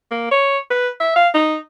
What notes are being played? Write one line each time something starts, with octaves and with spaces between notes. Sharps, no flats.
A#3
C#5
B4
E5
F5
D#4